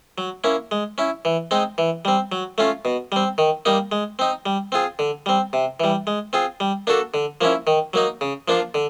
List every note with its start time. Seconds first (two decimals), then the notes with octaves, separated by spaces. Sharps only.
0.18 F#3
0.44 A#3 C#4 E4
0.71 G#3
0.98 C#4 E4
1.25 E3
1.51 G#3 C4 D#4
1.78 E3
2.05 G3 C4
2.32 F#3
2.58 A3 C#4 F4
2.85 B2
3.12 G3 C4
3.38 D#3
3.65 G3 A#3 D#4
3.92 G#3
4.19 C4 D#4
4.46 G3
4.72 C4 F4 G#4
4.99 D3
5.26 G3 C4
5.53 C3
5.80 E3 G3
6.07 G#3
6.33 C4 F4 G#4
6.60 G3
6.87 A#3 D4 F#4 A4
7.14 D3
7.41 F3 A#3 C#4 E4
7.67 D#3
7.93 F#3 A#3 D#4
8.21 C#3
8.48 F3 A#3 D4 F4
8.74 D3